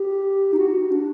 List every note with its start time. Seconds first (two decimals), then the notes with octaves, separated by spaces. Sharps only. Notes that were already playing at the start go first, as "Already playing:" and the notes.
Already playing: G4
0.53 D#4
0.58 F#4
0.91 D4